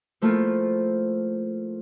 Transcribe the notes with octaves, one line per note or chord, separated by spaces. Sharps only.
F3 A3 A#3 E4 F4